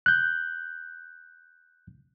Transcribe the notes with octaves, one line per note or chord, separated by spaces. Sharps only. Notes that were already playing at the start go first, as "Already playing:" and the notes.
F#6 G6